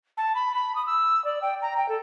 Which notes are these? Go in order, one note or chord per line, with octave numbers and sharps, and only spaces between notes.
A5
B5
B5
D#6
E6
D5
G5
A#5
G5
A4